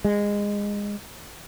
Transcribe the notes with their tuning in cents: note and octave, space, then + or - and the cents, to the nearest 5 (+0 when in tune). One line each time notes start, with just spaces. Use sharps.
G#3 -20